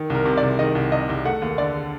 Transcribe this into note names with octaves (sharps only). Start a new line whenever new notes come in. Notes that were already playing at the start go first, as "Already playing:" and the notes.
Already playing: D#3
C2 A#4
C3
D5
C2
D#3 D#5
C2
C3 D#5
C2
A3 F#5
D#2
D3 D5